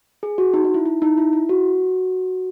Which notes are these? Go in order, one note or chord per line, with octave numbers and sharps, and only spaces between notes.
G#4
F#4
D#4
D#4
E4
E4
D#4
E4
E4
F#4